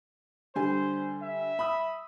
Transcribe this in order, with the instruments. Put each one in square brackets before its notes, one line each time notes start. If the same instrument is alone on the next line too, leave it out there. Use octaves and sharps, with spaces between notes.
[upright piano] D3 G3 G#5 [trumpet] C5
[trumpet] E5
[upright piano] B5 D#6 E6